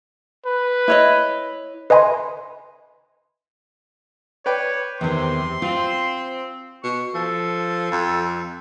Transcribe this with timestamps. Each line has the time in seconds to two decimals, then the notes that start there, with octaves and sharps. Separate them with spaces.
0.46 B4
0.88 E4 C#5 D#5
1.90 B4 D#5 E5 G#5 B5 C6
4.46 B4 C#5 D5 G5
5.01 E2 C3 D#3 C6
5.62 C4 F4
6.83 B2 C#6
7.15 F3 A4
7.92 F2